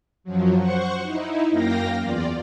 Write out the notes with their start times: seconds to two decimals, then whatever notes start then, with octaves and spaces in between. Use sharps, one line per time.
0.24 F#2 F3 F#3
0.58 C5 F#5 C#6
1.03 D#4 E4
1.50 F#2 A#3 F5 G5 A#6
2.00 E2 F4 D5